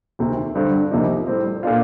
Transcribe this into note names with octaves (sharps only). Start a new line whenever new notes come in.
D2 C3 D#3
G2 D3 G3 C4
C2 C3 F3 A#3 D#4
A2 G3 C4
A#2 A3 D4 F4